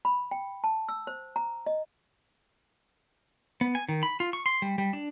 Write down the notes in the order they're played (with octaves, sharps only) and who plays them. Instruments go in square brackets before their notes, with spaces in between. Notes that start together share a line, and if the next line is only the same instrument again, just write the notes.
[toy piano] B5
G5
A5
E6
C5
A#5
D#5
[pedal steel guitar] B3
G#5
D#3
B5
F4
C#6
C6
G3
G3
D4